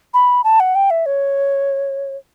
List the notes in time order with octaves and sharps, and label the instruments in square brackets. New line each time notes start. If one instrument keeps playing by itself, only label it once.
[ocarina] B5
A5
F#5
G5
E5
C#5